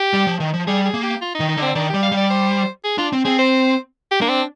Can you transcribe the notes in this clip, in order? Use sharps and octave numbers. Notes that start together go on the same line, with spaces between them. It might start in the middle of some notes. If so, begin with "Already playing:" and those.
Already playing: G4
G3
F3
D#3
F3
G3 G#4
G#4
A#3
G4
F4
D#4
D#3
D#4
D3
C4
D#3 D4
G3 G4
F5
G3
D5
C5
G#4
D4 F4
C4
C4 G#4
C5
G4
A#3 D4
C4